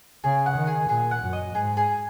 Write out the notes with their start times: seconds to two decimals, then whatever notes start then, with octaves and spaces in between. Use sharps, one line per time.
0.24 C#3 G#4
0.46 F#5
0.57 D#3
0.67 G#4
0.89 A#2 G#4
1.11 F#5
1.22 F#2
1.33 D#5
1.55 G#2 G#4
1.77 G#4